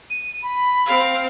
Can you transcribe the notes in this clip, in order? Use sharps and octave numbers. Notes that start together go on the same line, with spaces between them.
D#7
B5
C4 F5